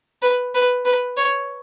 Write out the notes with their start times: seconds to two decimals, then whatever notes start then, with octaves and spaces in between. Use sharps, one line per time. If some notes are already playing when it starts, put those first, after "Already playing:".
0.22 B4
0.54 B4
0.85 B4
1.17 C#5